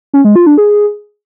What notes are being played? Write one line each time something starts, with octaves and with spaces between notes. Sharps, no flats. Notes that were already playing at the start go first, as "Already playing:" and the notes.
C#4
G#3
F4
D4
G#4